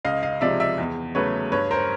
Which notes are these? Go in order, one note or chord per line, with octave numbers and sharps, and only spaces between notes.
C#2 D#5 F5
D#5 F5
C3 F3 G#3 D5 E5
D5 E5
E2
C#3 F#3 A3 B4 C#5
G2 B4 C#5
A#4 C5